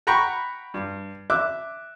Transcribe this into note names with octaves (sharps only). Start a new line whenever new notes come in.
F#5 G5 A#5 B5 C#6
G2
E5 D6 F#6